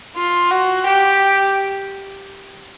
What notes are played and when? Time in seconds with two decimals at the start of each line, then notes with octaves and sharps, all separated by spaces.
0.16 F4
0.51 F#4
0.87 G4